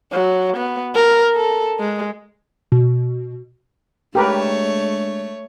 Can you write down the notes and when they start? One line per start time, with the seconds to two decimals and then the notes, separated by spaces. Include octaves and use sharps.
0.12 F#3
0.57 B3
0.95 A#4
1.36 A4
1.80 G#3
2.72 B2
4.15 G#3 A3 D4 G4 A#4 B4 C#5